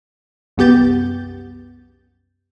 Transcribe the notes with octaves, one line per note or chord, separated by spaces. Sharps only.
C2 F#2 B3 G4 G6 A6